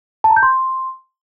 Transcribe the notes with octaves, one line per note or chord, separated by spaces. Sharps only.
A5
A#5
G6
C6